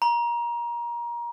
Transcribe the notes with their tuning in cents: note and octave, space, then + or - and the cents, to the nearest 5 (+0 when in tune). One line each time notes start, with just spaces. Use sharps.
A#5 +25